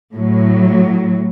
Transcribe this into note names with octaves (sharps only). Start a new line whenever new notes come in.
A2 F#3